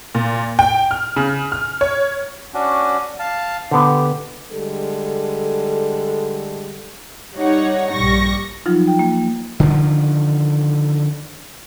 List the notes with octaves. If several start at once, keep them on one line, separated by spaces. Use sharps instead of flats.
A#2
G5
F6
C#3
F6
C#5
C#4 D4 F#4
F5 A5
D3 B3 G4
D3 G3 G#3 A4
G3 D#4 C#5 F#5
A#1 G2 G3 C#6 A#6
F3 F#3 D#4 F4
G5
A#3
D3 D#3 F3